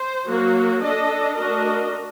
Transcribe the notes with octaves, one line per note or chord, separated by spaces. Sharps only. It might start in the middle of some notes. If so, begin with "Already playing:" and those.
Already playing: C5
F#3 A#3 F#4
D4 A4 D#5
A3 D4 F#4 A#4 D#5